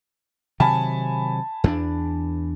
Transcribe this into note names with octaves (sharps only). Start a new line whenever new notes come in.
C3 D#3 F#3 G#5 A5 B5
E2 B3 D4